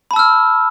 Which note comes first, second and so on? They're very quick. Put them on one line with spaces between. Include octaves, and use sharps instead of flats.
B5 A5 E6 F6